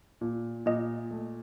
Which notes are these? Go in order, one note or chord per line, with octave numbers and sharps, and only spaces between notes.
A#2
A#2 D#5
A3